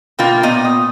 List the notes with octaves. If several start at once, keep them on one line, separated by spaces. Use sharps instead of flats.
B2 A#3 F4 G5
A#2 B3 D#5
D#6